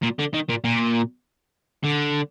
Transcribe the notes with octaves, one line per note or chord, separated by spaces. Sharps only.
A#2
D3
D#3
A#2
A#2
D3